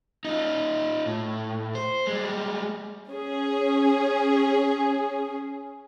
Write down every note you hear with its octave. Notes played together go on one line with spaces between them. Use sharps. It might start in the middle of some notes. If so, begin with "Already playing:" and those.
D#4 F4
A2
C5
G3 G#3
C#4 G#4